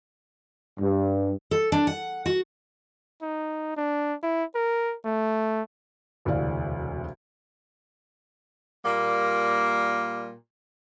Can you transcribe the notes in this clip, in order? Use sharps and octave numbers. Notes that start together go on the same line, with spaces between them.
G2
A4
D4
F#5
F#4
D#4
D4
E4
A#4
A3
E1 D2 C3 E4 D5 F5
A#2 G3 A#3